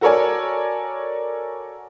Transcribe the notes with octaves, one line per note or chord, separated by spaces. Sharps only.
F#4 A4 A#4 C#5 D5 G#5